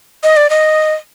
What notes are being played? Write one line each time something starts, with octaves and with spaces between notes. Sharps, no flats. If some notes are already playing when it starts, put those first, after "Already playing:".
D#5
D5
D#5